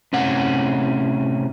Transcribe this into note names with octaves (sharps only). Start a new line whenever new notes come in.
A2 C3 C#4 F#5